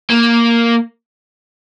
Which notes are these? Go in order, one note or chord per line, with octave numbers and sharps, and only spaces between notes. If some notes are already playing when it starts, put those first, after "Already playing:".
A#3